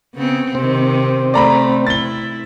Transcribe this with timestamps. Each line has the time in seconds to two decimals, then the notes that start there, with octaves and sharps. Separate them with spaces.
0.15 C#3 B3 C4
0.55 C3 D#3 C4
1.34 A3 D5 A#5 B5
1.87 E4 A6 G7